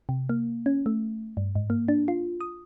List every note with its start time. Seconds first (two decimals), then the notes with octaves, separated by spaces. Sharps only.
0.09 C3
0.29 A#3
0.66 C#4
0.86 A3
1.37 G2
1.55 G#2
1.70 A#3
1.88 D4
2.08 F4
2.41 D#6